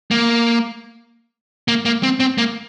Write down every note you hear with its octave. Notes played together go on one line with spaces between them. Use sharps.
A#3
A#3
A#3
C4
C4
A#3